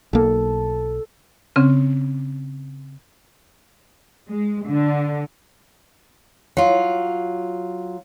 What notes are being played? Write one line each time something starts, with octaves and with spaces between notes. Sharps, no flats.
B1 A#3 A4
C#3 C4 C#4
G#3
D3
F#3 F4